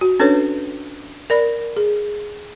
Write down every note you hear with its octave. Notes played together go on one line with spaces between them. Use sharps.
F#4
C#4 D4 A4 B4 C#5
A#4 D5 B5
G#4